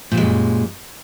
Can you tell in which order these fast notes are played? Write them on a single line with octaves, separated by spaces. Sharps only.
A#2 G3 G#3 F#2